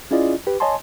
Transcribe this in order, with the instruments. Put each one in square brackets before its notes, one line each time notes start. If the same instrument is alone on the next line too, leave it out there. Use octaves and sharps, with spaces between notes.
[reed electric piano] C#4 E4 F4 G#4 D5 D#5
G4 B4
C#5 D#5 G#5 A5 C6